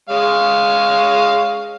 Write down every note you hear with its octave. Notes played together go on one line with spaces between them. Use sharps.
G#3 C#5 F5